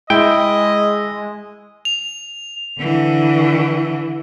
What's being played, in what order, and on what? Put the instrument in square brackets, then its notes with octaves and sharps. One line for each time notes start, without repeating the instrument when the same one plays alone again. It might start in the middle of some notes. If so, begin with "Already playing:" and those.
[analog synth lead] G#3 [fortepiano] E4 [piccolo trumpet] D#5 [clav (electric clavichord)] G5
[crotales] F7
[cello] D3 E3